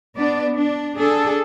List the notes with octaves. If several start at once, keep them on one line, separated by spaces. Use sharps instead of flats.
B3 D4 D5
D4
D4 G#4 A4